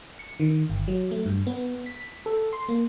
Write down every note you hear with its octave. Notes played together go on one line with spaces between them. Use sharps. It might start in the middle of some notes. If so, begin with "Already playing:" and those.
C#7
D#3
G1
F#3
A3
G2
B3
B6
A4
C6
A#3